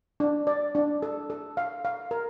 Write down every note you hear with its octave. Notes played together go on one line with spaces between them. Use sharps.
D4
D5
D4
A4
A4
F5
F5
A#4